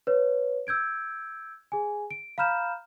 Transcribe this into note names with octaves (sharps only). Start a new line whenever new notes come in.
B4 C#5
E6 G6 G#6 D7
G#4 G#5
D7
F5 A#5 B5 F6 G6 E7